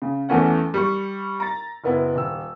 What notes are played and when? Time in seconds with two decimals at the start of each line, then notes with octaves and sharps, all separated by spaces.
0.02 C#3
0.29 E2 E3 A3 C#4 F#5
0.74 G3 C#6
1.40 A#5 A6
1.84 F#1 B3 E4
2.15 D#1 E6